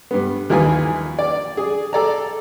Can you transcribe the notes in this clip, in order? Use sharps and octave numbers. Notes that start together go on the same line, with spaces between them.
G2 B3
D#2 E3 F3 D#4 F4 G#5
D5
G#4
A4 D5 A#5